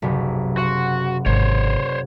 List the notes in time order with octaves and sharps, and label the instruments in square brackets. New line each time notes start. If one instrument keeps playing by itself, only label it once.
[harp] F#1 B1 C3
[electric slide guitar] F#4 [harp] F#5 C6
[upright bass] G#1 [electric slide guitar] C5 C#5